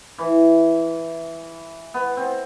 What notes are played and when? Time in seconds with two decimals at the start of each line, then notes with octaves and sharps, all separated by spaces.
0.18 E3
1.94 B3
2.17 C4